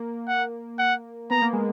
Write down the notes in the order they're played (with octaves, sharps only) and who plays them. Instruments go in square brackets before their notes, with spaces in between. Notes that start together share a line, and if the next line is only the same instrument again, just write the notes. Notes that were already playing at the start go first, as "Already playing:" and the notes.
Already playing: [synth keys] A#3
[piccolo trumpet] F#5
F#5
[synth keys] B3 [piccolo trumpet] A#5
[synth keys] A#3
G#3